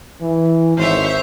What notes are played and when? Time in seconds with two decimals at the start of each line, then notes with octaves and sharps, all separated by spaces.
0.21 E3
0.77 G#1 C5 C#5 E5